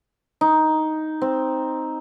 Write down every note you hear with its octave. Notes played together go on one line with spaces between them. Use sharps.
D#4
C4